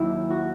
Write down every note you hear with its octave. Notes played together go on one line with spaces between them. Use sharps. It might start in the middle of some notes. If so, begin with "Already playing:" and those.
Already playing: D#2 D#3 F#3 E4
F#4